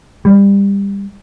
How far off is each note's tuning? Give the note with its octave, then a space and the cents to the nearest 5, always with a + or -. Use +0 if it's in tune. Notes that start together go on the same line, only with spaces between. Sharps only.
G3 +25